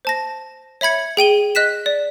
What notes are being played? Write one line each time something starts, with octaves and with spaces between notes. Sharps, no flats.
C5 A5 A#6
C#5 E5 B5 G#6 C#7
G#4 G5 D#7 G7
D#5 F#6 B6 E7
D5